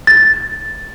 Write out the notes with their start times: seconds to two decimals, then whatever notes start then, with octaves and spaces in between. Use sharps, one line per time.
0.07 A6